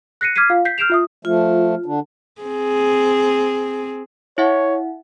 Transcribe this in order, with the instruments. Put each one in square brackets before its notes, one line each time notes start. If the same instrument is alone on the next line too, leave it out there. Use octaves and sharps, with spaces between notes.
[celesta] F#6 A#6 C7 C#7 D#7
D6 F6 G#6 B6 C7 D#7
F4 F5
G6 B6 C7
F6 G6 C7 D7 E7 F7
F4 E5 D#6
[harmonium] F3 A3 [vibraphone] F4
[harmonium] D3 D4
[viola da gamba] C4 G#4
[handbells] E4 E5 F#5 [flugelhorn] C#5